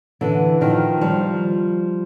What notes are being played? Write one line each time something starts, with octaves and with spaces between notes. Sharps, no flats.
D3 E3
D#3 F3
F3 G3